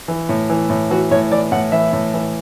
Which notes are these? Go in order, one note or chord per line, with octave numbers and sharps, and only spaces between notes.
E3
A2
E3
A2
E3 F#4
A2 C#5
E3 D5
A2 F#5
E3 E5
A2
E3